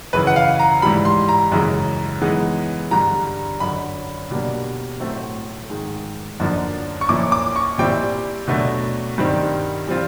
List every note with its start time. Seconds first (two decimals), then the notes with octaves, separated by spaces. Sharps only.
0.13 F#2 C#3 E3 B4
0.27 F#5
0.36 F5
0.59 A#5
0.82 G#2 E3 G3 B5
1.05 C6
1.29 A#5
1.52 F#2 C#3 E3 G#3
2.22 E3 G#3 B3 D#4
2.91 G2 D3 G3 A#5
3.60 F#2 D3 F#3 B5
4.31 B2 G3 A#3 D4
5.00 A2 F#3 A3 C4
5.70 G#2 D#3 G#3
6.40 F#2 D3 F3 A#3 D4
7.01 C#6
7.09 A#2 F3 A#3 C#4 E4 D6
7.32 D6
7.56 C#6
7.78 A#2 G3 C4 E4 G5
8.48 B2 F#3 A3 D4
9.18 G2 D#3 G3 C4
9.87 E3 G3 C4 F4